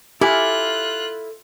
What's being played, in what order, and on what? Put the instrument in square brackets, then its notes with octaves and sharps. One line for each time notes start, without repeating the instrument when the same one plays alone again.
[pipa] E4 [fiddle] F4 F#6 [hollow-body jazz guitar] G4 G#5 [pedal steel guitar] A4 D6 F6